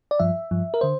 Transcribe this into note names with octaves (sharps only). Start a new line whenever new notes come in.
D5
G2 F3 E5
G2 F3
A#4
D3 C5